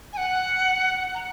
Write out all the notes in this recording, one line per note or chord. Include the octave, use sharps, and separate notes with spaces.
G#5
F#5
A#5